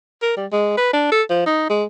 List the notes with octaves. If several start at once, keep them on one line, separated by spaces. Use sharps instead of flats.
A#4
G3
G#3
B4
D4
A4
F3
D#4
G#3